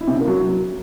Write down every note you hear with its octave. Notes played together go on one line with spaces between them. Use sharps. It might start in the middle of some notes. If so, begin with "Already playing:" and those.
E4
C3
C#3
A#3
F#3